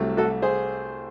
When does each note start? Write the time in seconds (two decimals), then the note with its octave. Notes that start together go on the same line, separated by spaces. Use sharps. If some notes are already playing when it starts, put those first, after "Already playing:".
Already playing: C2 C3 F#3 A3
0.17 F#4 A4
0.42 G#4 C5